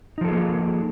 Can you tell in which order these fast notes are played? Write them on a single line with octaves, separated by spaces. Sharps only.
D#4 F3 A4 G#4 A#3